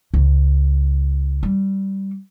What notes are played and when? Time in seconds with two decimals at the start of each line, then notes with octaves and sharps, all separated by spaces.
0.14 C#2
1.43 G3